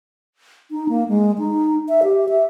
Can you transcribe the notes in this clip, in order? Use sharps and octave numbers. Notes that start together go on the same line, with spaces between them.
D#4
A#3
G#3
D#4
E5
G4
E5